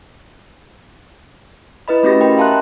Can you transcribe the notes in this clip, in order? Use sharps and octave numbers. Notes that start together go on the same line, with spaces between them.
E4 B4 D#5 B5
A3 C#4 F#4 G4 D#5 A#6
A#4 D#5 G5 B5
E5 F5 A5 A#5 C6 F#6